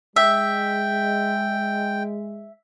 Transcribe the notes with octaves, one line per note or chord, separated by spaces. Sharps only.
G#3 E5 G5